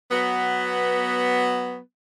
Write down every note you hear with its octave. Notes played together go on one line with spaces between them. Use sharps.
F#3 B3